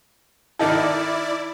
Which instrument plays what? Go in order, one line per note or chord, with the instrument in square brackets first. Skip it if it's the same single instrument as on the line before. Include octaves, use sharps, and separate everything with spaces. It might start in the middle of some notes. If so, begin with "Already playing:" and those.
[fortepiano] D#3 D#4 A4 [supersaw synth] E4 D5